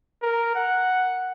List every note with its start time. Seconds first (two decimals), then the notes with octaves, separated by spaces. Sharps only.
0.23 A#4
0.55 F#5